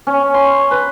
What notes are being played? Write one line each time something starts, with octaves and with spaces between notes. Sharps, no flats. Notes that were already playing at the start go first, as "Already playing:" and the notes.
C#4
C6
B4